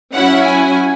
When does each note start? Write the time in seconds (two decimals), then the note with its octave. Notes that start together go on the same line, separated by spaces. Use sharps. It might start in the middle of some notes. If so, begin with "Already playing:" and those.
0.15 F#3 C#4 E4 F#5
0.46 G#5